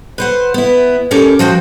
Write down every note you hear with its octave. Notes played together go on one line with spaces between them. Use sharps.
B4 C5 F#5
B3 E4
C#4 G4 A4 A#4 C#5
F3 F#4 C5 G5